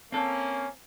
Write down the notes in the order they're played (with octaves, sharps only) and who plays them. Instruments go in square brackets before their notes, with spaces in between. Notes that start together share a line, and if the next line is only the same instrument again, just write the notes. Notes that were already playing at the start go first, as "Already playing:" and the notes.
[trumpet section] A#3 C#4 [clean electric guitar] C4 A4